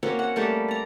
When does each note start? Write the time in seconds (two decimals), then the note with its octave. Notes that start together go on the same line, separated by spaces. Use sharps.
0.03 A#3 C4 C#4 F#4
0.19 F#5
0.36 G3 A3 A#3 G4
0.68 D5 A#5